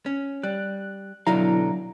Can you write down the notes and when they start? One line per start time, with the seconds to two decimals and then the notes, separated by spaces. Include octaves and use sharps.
0.06 C#4
0.43 G3 F#6
1.27 B1 D3 F#3 E4 F5 A#5